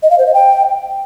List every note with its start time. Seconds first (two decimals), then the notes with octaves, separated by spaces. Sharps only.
0.03 D#5
0.11 F5
0.18 C5
0.26 D#5
0.34 G5